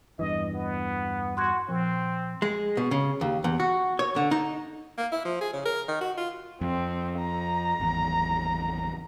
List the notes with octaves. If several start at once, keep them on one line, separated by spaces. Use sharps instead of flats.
E2 G2 E3 D#5
B3
F#4 C6 F#6 G#6
A#2 F3 C4
G#3
B2
C#3
D#2
E2
F#4
C#5
D3
D#4
A#3
E4
F3
G#4
C#3
A#4
D#3
F#4
F4
F2 C4
A#5
G#1 E2